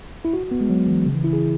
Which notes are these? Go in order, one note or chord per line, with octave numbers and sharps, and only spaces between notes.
E4
F#4
B3
G#3
F#3
E3
C#3
E3
E4
G#4